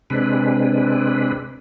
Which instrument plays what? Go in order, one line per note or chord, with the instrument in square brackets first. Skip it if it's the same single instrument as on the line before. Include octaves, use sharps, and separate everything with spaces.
[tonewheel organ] C3 G#3 C4 D4 B4